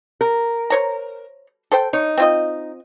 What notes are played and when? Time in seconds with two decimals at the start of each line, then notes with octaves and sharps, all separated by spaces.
0.21 A#4
0.70 C5 C#5 A#5
1.72 A4 C5 G5
1.93 D#4 C#5
2.18 C4 F4 D#5